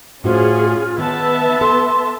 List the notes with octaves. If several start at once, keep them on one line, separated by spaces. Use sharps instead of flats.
A2 C#4 F4 F#4 G#4 C5
D#3 B3 E5 A5
A4 C6